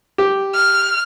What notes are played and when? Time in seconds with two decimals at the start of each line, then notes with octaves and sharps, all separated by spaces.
0.18 G4
0.55 F6